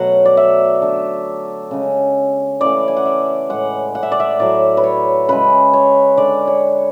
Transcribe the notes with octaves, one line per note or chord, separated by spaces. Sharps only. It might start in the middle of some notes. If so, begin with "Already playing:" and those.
Already playing: B2 F#3 A3 F#5
D5
E5
D3 A3
C#3 G#3
C#3 E3 A3 D5
G#5
F#5
E5
A2 G#3 F#5
F#5
E5
D5
E5
A2 F#3 A3 D5
B4
C#5
C#3 G#3 B4
C#5
D3 G#3 D5
C#5